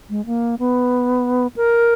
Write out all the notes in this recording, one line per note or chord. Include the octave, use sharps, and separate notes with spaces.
G#3
A#3
B3
A#4